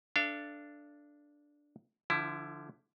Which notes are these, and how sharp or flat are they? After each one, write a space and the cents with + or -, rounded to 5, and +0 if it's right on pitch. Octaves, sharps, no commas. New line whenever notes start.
D4 -5 A4 +5 F5 -35
D3 +0 F3 -25 E4 +10